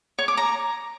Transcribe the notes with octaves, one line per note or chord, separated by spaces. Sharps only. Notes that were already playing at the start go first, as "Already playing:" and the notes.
C#5
D6
A#5